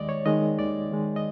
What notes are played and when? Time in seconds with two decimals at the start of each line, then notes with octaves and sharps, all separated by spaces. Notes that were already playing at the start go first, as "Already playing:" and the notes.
Already playing: D#2 D#3 G#3 D5 D#5
0.09 C#5
0.26 D#3 G#3 D#5
0.59 D#2 D5
0.92 D#3 G#3
1.16 D#5